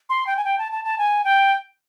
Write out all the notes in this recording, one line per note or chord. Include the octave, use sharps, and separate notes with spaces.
C6
G5
G#5
G5
A5
A5
A5
G#5
G5